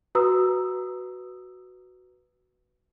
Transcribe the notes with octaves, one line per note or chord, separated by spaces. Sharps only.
F#4 B4 A#5 D#6 E6